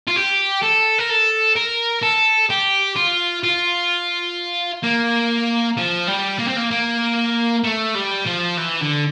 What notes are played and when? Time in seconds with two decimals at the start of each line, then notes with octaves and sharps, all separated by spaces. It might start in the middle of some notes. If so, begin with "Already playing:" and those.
0.07 F4
0.16 G4
0.63 A4
0.99 A#4
1.10 A4
1.56 A#4
2.02 A4
2.50 G4
2.96 F4
3.44 F4
4.83 A#3
5.78 F3
6.08 G3
6.39 A#3
6.48 C4
6.57 A#3
6.71 A#3
7.64 A3
7.95 G3
8.26 F3
8.58 E3
8.82 D3